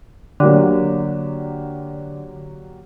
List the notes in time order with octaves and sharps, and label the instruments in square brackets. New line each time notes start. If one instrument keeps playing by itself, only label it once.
[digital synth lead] D3 [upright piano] F#3 A#3 G4